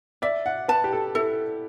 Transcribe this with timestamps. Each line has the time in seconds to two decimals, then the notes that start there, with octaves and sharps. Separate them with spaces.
0.22 D5 E5
0.46 F#5
0.68 B4 A5
0.84 G4
0.93 A4
1.15 E4 A4